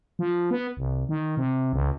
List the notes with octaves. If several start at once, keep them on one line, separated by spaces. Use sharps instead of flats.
F3
B3
C2
D#3
C3
C#2